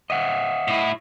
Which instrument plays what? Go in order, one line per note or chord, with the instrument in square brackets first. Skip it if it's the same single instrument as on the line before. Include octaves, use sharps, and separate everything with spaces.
[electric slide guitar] D#5 E5 F#5
[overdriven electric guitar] A2 E4